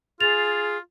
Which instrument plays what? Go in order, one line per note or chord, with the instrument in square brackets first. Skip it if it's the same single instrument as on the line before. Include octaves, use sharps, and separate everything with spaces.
[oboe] F4 [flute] G#4 [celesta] A6 F7